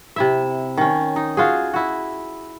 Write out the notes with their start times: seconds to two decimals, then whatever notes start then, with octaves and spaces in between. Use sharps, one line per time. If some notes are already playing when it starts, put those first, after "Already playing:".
0.16 C3 E4 E5
0.78 D#3 C#4
1.16 D#4
1.37 F4 F#4 G#4
1.74 E4 F#4